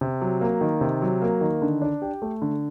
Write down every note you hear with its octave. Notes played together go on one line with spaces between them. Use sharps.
C3
F#3
A#3
D#3
C3
F#3
A#3
D#3
D3
D4
G4
A3
D3